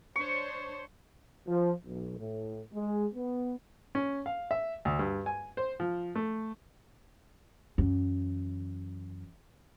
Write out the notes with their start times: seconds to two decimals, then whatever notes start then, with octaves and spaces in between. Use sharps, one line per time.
0.16 D4 C5 C#5 C#6
1.47 F3
1.85 B1
2.19 A2
2.74 G#3
3.14 B3
3.95 C#4
4.26 F5
4.51 E5
4.85 D2
4.99 G2
5.26 G#5
5.57 C5
5.80 F3
6.15 A3
7.78 F#2 E3